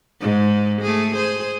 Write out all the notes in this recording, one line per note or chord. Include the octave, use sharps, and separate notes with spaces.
G#2 G#3
A3 G#4
G#4 C5